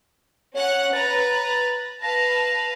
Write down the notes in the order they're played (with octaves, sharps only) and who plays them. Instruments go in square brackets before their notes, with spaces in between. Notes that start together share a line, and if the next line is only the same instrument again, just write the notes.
[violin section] C#4 F#5 F#6 [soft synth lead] C#5
[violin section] B4 A#5 [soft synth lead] A6
[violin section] B4 F5 A5 [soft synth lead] A#6